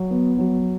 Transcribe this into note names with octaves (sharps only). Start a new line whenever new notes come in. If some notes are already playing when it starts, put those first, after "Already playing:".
Already playing: F#3
B3
F#3